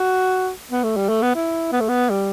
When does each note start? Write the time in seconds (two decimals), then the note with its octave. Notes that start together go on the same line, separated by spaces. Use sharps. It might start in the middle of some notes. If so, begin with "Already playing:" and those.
Already playing: F#4
0.71 B3
0.83 A3
0.96 G3
1.09 A3
1.22 B3
1.35 E4
1.72 B3
1.80 A3
1.89 B3
2.10 G3